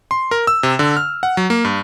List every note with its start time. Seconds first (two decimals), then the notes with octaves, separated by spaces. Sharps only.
0.11 C6
0.31 A#4
0.47 E6
0.63 C3
0.79 D3
0.97 F6
1.23 F#5
1.37 F#3
1.50 A#3
1.65 G2